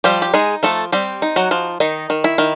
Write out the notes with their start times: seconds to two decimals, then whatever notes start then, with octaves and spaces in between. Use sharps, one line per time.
0.04 F3 G3 G4
0.22 G4
0.34 G#3 D#4 G#4
0.63 F3 A3 A4
0.92 G3 C4 G4
1.22 D#4
1.36 F#3 F#4
1.51 F3
1.80 D#3 D#4
2.10 D#3
2.24 E4
2.38 D#3